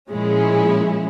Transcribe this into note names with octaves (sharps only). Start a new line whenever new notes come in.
A#2 F3 G#3 C#4 E4